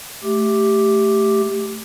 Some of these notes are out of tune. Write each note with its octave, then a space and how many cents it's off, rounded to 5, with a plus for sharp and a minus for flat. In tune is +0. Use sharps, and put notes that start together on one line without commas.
A3 -5 G4 +0